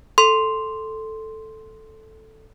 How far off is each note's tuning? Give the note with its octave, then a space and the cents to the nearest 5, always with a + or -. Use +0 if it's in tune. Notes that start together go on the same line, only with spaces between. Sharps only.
A4 +0 C6 +0